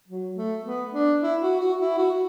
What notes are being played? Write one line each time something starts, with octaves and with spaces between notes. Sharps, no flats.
F#3
A3
B3
D4
E4
F#4
F#4
E4
F#4